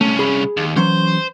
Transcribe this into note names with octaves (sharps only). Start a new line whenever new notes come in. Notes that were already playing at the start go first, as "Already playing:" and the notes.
C2 A3 C#4
G#4 B5
D#2
E3 F#3 C#4 C5